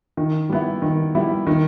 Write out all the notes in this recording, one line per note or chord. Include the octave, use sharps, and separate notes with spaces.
D#3
G3 B3 E4
D#3
G3 B3 E4
D#3